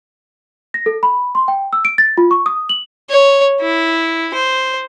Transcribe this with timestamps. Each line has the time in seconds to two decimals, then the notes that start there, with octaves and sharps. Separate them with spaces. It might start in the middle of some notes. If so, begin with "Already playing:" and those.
0.74 A#6
0.86 A4
1.03 B5
1.35 C6
1.48 G5
1.73 E6
1.85 D7
1.98 A6
2.18 F4
2.31 C#6
2.46 D#6
2.69 F#7
3.10 C#5
3.61 E4
4.35 C5